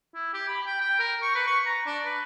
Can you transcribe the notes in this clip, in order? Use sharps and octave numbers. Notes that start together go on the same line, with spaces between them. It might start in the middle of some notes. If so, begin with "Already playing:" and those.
E4
G4
B5
G5
G5
A#4
C#6
B4
C#6
A#5
D4
B4